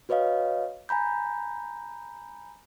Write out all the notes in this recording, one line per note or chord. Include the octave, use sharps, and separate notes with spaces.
F#4 B4 C#5 D#5 F5
G#5 A#5 B5 G6